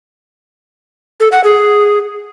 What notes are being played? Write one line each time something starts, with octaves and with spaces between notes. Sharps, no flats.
A4
F#5
G#4